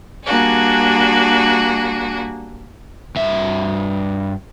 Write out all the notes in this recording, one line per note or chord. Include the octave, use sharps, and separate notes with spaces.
G3 A#3 D4 F#4 G#4
G2 E5